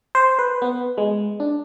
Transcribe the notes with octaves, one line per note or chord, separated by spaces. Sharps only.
C5
B4
B3
G#3
D4